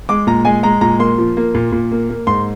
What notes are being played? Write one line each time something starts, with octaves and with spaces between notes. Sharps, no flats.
G#3 D6
A#2 A#5
G#3 G#5
G#3 A#5
A#2 A#5
A#3 C6
F3
A#3
A#2
A#2
A#3
A#3
G#2 C6